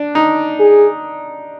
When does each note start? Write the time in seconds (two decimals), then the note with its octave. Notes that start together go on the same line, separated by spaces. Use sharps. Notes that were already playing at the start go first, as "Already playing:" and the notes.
Already playing: D4
0.15 D#4
0.60 G#4